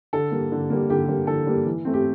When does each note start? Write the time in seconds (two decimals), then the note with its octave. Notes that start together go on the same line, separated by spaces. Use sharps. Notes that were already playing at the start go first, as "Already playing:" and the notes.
0.13 D3 A4
0.32 G3 A#3
0.52 D3
0.70 G3 A#3
0.90 D3 G4
1.09 G3 A#3
1.27 D3 A4
1.47 G3 A#3
1.66 E3
1.85 A3 C4
1.94 G4